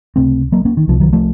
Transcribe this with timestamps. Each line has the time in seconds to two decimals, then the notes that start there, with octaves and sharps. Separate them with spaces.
0.16 C#2 C3 A3 C4
0.52 F#3 A#3
0.65 A#3 C#4
0.77 D#3
0.88 C2 C3 F3
1.00 D#3 F#3
1.13 F3 A3